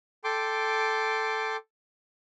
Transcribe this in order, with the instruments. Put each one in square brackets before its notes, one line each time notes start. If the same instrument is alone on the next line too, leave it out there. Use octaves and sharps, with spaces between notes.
[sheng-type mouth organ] A4 G5 C6 D6